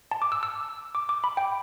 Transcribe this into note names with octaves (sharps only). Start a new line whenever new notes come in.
A5
D6
E6
E6
D6
D6
B5
G5